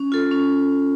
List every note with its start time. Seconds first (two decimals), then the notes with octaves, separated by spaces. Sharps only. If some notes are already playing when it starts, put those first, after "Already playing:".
Already playing: C#4
0.12 F4 A4
0.31 C#4